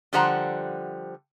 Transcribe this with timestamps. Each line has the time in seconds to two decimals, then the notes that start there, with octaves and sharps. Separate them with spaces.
0.13 D3 F3 G3 C5 F#5 A#5